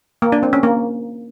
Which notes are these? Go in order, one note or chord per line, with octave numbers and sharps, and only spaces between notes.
A#3
D4
C4
C#4
A#3